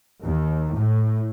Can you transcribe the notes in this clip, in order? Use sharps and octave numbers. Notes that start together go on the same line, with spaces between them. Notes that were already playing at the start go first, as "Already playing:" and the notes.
D#2
A2